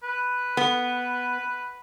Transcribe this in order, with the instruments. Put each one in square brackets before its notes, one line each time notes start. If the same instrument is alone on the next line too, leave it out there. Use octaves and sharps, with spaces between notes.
[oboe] B4
[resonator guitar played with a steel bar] B3